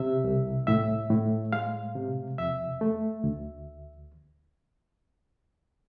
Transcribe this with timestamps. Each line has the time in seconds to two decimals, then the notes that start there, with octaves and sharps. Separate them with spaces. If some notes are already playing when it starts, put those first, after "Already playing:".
Already playing: C3 E5
0.24 C2
0.67 A2 E5
1.10 A2
1.53 G#3 F5
1.96 C3
2.38 F2 E5
2.81 A3
3.24 D2